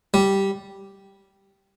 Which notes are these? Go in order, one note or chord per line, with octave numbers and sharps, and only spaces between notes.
G3